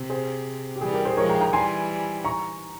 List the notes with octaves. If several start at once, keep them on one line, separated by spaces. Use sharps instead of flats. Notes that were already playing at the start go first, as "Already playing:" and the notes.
Already playing: C3
G#4 C5
G4
E3 G3 G#4
G4 A#4
G#4 C5
F3 G#3 A#4 C#5
G5 A#5
G5 A#5
E3 G3 G#5 C6
A#5 C#6